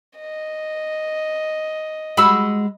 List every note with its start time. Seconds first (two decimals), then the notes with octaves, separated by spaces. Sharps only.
0.18 D#5
2.17 G#3 F#4 B5 E6